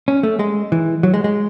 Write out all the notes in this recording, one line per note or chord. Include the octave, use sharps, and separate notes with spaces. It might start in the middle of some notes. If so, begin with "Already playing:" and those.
C#4
A3
G#3
E3
F#3
G#3
G#3